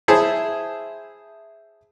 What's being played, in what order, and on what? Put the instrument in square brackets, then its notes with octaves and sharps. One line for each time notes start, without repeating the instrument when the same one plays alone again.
[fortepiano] E4 G#4 C5 E5 A5